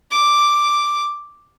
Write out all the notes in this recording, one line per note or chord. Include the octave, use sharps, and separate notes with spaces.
D6